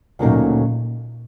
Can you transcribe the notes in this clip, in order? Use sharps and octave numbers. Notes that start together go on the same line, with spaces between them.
D2 A#2 C#3 F#3 A#3 D#4